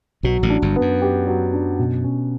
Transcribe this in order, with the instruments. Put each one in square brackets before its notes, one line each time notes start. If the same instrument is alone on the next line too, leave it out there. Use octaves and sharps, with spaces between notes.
[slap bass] B1 B2 [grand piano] F#3
[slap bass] A1 A2
[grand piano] D4
[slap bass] G1 G2
[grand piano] B3
[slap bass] F#2
[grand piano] G4
F#3
D4
B2
C#4